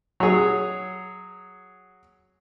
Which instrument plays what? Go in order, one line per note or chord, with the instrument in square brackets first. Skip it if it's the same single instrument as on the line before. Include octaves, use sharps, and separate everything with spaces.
[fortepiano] F#3 G#4